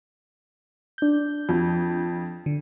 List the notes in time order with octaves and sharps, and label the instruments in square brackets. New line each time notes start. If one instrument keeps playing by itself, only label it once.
[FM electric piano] D4 G6
[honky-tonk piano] F2
[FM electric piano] D3